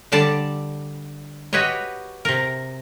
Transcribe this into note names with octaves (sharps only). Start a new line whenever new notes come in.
D3 G3 D5 A5
F#4 G4 B4 C#5 D#5
C3 A#4